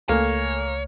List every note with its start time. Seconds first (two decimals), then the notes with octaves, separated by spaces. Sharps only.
0.09 C#2 A3 A#3 A4 C#5 G#5